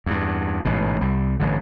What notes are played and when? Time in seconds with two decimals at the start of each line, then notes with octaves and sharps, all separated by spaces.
0.06 E2 G2
0.65 A1 G#2 B2
1.01 C2 G3
1.40 A1 G2 D3